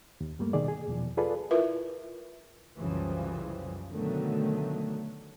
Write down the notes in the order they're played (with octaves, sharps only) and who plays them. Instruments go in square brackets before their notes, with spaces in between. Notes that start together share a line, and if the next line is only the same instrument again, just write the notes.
[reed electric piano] D#2
G2 G3 A3 A#3
B2 D#3 G#4 D5
G#4
E2 B2 F3
F4 G#4 A4 B4 D5
[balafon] E4 F4 A#4 B4 E5
[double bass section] C2 F#2 C#3 E3 F3 G3
B2 D3 D#3 F#3 A3